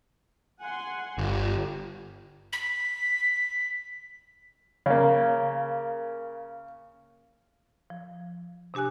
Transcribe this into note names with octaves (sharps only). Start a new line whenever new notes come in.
F#5 G#5 C6
G1 F4 G4
B6
C#3 A#3
F3
C3 D4 G4 G#5 F#6